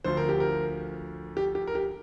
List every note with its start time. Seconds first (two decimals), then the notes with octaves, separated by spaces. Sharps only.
0.04 D2 D3 F3 C5
0.17 A#4
0.29 G4
0.40 A#4
1.37 G4
1.55 G4
1.67 A#4
1.75 G4